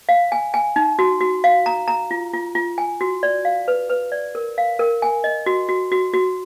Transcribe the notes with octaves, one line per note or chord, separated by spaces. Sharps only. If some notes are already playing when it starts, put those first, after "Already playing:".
F5
G#5
G#5
D#4
F#4
F#4
F5
A#5
A#5
F4
F4
F4
G#5
F#4
D5
F5
B4
B4
D5
A#4
F5
A#4
G#5
D#5
F#4
F#4
F#4
F#4